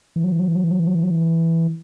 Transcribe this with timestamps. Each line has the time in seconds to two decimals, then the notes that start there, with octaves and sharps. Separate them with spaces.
0.16 E3
0.24 F#3
0.32 E3
0.40 F#3
0.48 E3
0.55 F#3
0.64 E3
0.71 F#3
0.79 E3
0.87 F#3
0.95 E3
1.03 F#3
1.11 E3